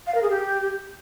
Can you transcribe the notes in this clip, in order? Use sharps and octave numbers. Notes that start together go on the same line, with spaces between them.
F5
A#4
G#4
G4